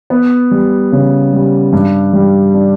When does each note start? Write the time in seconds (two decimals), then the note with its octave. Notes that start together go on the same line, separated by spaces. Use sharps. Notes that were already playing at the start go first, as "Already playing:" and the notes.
0.10 B3
0.51 G3
0.92 C#3
1.33 G3
1.73 G2
2.13 G3
2.54 D4